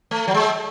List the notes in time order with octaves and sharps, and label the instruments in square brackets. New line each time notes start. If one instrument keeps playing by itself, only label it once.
[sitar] A3
F#3
G#3